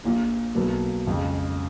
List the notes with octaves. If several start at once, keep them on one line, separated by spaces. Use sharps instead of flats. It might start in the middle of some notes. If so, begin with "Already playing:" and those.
A#1 A#2 F3
B1 B2 F#3 A#3
F2 C#3 G#3